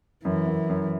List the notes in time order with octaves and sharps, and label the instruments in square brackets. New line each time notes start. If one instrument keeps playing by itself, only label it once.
[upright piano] F#2 [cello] E3
[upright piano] F#2
F#2